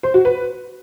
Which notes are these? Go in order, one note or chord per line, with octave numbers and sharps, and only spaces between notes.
C5
F#4
B4